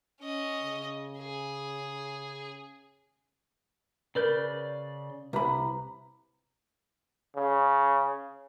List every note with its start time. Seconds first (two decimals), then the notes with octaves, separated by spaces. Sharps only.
0.21 C#4 D#5
0.63 C#3
1.19 G#4
4.15 C#3 A#4 B4 D5 G6
5.33 C2 G4 B4 E5 A#5 B5
7.36 C#3